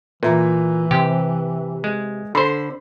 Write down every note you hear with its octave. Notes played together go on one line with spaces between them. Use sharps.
A#2 E3 B4 E5 A#5
C3 G4
G#3
D3 C5 B5 C6